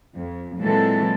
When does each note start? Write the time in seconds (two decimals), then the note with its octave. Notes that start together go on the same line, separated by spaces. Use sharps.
0.16 F2
0.59 A#2 E3 F#3 G#3 C4 A4